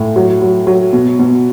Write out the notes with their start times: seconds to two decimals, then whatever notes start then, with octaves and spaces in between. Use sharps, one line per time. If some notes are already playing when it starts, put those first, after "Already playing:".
Already playing: A2
0.16 F#3
0.42 F#3
0.67 F#3
0.93 B2
1.19 B2